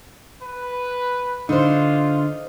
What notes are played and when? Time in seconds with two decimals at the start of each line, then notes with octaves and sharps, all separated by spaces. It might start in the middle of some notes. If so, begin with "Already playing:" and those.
0.42 B4
1.49 D3 D#4 F4 C5